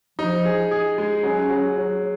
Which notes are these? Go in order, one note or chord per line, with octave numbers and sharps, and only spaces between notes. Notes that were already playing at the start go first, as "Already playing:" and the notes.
F3 D#4
G#4
G#4
G#3
F#3 C#4
F#3
F#3